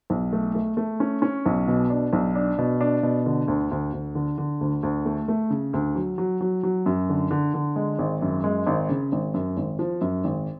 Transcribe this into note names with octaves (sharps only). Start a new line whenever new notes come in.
B1
A3
A3
A3
C#4
C#4
B1
B2
D4
B1
D4
B2
D4
B2
D3
D2
D2
D2
D3
D3
D2
D2
A3
A3
C#3
D2
F#3
F#3
F#3
F#3
F#2
D3
D3
D3
G#3
G#1
F#2
G#3
G#1
C#3
G#1
F#2
G#1
F3
F#2
G#1